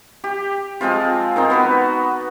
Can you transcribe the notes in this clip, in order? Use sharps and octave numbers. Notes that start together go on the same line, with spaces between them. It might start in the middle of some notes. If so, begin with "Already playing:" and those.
G4
F3 G#3 C4 F4
C4 D#4 A#4
B3 F#4 B4